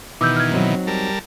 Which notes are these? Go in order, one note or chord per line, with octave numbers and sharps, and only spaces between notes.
B2 D#3 E3 D6 E6 G6
F6 G#6
F#3 C4 D#4
G3 A#4 A5